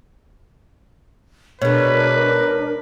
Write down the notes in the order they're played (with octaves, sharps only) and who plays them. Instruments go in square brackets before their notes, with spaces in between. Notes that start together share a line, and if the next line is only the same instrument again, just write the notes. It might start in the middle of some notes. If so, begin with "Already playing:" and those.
[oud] B2 G#3 [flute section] D4 A#4 [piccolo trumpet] B4 [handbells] C#5